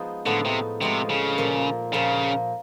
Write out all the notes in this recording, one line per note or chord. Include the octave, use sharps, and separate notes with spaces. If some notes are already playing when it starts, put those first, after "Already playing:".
Already playing: F3 G#3 B3 D#4
A2 D3 F3 G#3 B3 D#4
C3
A2 C3 F3 G#3 B3 D#4
C#3
A#2 F3 A#3
A#2 C#3 F3 A#3